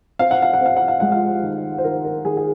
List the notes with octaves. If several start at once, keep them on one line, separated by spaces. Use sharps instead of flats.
C4 F5
F#5
F5
F#5
C4 F5
F#5
F5
G#3 F#5
F4 F5
D#3
C5
D#3 A#4
A#4
D#3 G#4
G#4